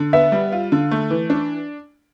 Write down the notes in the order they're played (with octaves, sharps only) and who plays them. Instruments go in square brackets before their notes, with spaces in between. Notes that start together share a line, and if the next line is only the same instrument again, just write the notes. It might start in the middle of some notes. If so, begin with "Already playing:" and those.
Already playing: [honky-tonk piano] D3
[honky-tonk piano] B3 [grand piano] E5
[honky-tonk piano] G3
F4
D3
A3
E3
D4